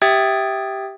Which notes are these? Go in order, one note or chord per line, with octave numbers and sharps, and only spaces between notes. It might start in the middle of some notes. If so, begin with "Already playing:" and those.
G4 E5 G5 D#6 G#6 A6